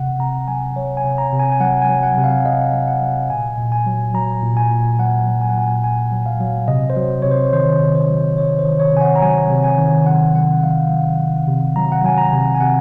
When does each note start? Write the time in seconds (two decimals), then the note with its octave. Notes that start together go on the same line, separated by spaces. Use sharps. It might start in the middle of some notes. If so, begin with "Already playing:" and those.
Already playing: C3 F#5
0.19 C3 A#5
0.48 F#3 G#5
0.76 F#3 C#5
0.97 G#5
1.05 C3
1.18 A#5
1.33 C3
1.39 G#5
1.52 G#5
1.61 F#3 F#5
1.82 G#5
1.89 F#3
2.03 F#5
2.17 C3
2.24 F5
2.45 C3 D#5
2.73 F#3
2.88 F#5
3.01 F#3
3.30 A#2 G#5
3.58 A#2
3.72 G#5
3.86 F#3
4.14 F#3 A#5
4.42 A#2
4.57 G#5
4.71 A#2
4.99 F#3 F#5
5.27 F#3
5.41 G#5
5.49 F#5
5.55 A#2 G#5
5.84 A#2 G#5
6.12 F#3
6.26 F5
6.41 F#3
6.68 C3 D#5
6.90 C5
6.97 F#3
7.22 C3 C#5
7.31 C5
7.53 D#3 C5
7.81 C3
7.95 C5
8.09 F#3
8.37 C3 C#5
8.59 C5
8.66 D#3
8.80 C#5
8.94 C3 G#5
9.01 F#5
9.16 A#5
9.22 F#3 G#5
9.50 C3
9.64 G#5
9.78 D#3
10.06 C3 F#5
10.35 C3 F#5
10.63 F#3 F5
10.91 F#3 F#5
11.19 C3
11.48 C3
11.76 F#3 A#5
11.92 F#5
12.04 F#3 G#5
12.18 A#5
12.33 C3
12.55 G#5
12.61 C3 F#5